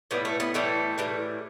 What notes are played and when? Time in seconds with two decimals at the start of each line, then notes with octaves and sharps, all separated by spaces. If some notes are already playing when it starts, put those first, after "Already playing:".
0.11 A2 E3 G3 B3
0.25 A3
0.40 B3
0.54 A2 E3 G3 A3
0.98 A2 E3 G3